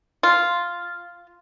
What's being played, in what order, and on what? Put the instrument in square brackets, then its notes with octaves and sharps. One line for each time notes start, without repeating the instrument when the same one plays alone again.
[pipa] F4